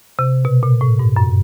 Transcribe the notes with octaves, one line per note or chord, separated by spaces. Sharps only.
C3
B2
A#2
A2
G2
F#2